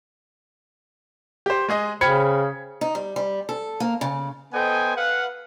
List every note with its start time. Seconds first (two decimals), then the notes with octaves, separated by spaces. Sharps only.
1.46 G4 C5
1.68 G#3 G#4 D#5
2.01 C#3 C5 G5 B5 F6 G#6 C#7
2.81 D#4
2.95 G3
3.16 G3
3.49 A4
3.80 A#3
4.01 C#3
4.53 B3 A4 C5 D#5 G5 G#5
4.96 B4 F5 F#5